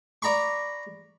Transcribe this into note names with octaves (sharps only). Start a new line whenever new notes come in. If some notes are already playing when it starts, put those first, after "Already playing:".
D5 A#5 B5 C#6